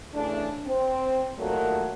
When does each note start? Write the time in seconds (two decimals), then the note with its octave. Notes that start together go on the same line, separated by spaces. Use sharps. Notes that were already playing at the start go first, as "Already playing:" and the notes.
0.14 C#3 E3 A3 D4
0.66 C4
1.38 A#2 D#3 F#3 G3 A3 A#3